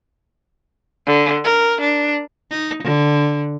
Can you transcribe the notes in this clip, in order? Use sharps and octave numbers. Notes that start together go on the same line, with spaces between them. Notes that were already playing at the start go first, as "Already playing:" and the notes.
D3
A#4
D4
D#4
D3